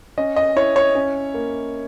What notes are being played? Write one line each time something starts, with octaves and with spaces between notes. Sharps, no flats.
C#4 D#5
D#5
E4 C#5
C#5
C#4
A#3